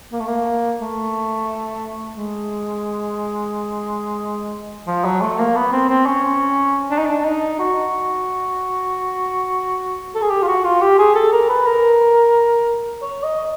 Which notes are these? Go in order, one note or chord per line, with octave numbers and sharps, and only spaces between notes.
A#3
A3
A#3
A3
G#3
F3
F#3
A3
A#3
B3
C4
C4
C#4
D4
D#4
D4
D#4
F#4
A4
G#4
G4
F4
F#4
F4
G4
G#4
A4
A#4
B4
A#4
C#5
D#5